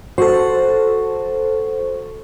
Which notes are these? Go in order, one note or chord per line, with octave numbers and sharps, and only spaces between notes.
F#4 A4 C5